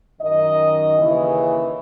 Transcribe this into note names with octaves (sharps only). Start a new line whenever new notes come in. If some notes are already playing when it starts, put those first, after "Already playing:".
F#2 D#3 D#5
D#2 C#3 E3